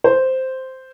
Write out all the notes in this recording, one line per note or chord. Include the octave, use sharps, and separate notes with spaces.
C5